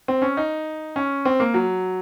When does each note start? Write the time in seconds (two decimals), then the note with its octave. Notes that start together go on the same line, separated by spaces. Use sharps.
0.08 C4
0.22 C#4
0.37 D#4
0.96 C#4
1.25 C4
1.40 A#3
1.54 F#3